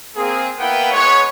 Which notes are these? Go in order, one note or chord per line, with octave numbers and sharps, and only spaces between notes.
A#3 C4 G#4
A#3 B3 E4 B4 F#5 G5
G#3 B3 B4 C#5